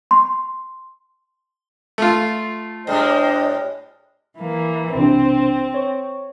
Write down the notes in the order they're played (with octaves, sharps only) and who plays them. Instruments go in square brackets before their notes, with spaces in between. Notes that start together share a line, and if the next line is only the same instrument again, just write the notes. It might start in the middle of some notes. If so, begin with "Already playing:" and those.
[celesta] C6
[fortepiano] A3 F4
[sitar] A2 G3 G#3 [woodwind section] D4 C5 D#5
[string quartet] E3 A#3
[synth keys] B1 C3 D4 [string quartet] C4
[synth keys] C#5 C#6